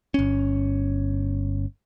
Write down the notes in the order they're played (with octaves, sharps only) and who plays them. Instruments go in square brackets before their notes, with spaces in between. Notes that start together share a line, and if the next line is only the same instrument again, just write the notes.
[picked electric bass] G1 C#4